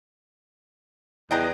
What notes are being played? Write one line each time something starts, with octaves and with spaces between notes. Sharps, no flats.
E2 F3 G3 G#4 D#5 G5 A#5